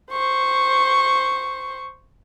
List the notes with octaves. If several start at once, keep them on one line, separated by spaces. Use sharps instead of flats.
C5 C#6